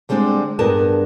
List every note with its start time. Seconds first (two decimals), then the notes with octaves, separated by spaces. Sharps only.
0.09 D3 G3 G#3 C4 D4 C5
0.59 G2 B3 D4 G#4 A#4 A5